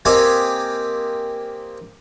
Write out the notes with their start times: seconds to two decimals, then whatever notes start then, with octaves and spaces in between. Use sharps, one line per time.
0.05 A#3 C4 G4 D#5 E5 G#5